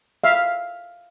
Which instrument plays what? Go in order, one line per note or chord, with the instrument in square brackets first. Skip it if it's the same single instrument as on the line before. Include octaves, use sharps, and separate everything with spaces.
[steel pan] E5 F5